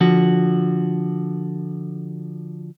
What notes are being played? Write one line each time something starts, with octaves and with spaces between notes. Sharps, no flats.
D3 F3 F#4